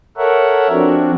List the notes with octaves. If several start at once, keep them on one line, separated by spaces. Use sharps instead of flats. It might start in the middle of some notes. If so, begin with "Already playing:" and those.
A4 A#4 C#5 E5 F#5
F3 C4 D4 F#4